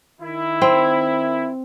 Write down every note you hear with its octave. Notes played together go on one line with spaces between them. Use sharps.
D#3 E4
C4